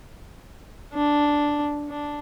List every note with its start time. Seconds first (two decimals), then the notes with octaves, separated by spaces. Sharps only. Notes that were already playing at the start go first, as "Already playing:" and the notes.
0.93 D4
1.90 D4